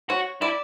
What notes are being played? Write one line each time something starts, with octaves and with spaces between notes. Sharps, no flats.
F#4 C#5
E4 D5